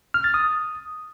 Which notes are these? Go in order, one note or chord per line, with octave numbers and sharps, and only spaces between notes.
F6
A6
D#6